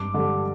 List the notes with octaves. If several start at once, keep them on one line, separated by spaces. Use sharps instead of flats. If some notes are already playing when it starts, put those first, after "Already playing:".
Already playing: G2 D6
D3 G3